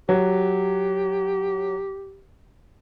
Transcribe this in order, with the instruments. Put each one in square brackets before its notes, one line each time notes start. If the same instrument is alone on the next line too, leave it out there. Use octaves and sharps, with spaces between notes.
[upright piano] F#3 [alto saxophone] G4